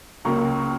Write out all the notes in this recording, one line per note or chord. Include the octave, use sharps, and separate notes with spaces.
C#2 C#3 F#3 A#3 A#5 C#6